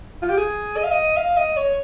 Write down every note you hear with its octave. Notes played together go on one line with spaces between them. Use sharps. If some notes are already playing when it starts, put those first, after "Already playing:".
F4
G4
G#4
D#5
F5
D#5
F5
D#5
C#5